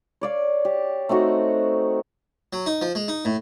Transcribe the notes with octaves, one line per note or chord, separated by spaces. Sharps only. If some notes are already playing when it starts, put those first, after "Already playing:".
C#5 D5 F5
G4
A3 C4 D#4 F#4
F#3
D#4
F3
G#3
D#4
A2